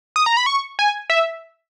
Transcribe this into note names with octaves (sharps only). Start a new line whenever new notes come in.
D#6
A#5
B5
C#6
G#5
E5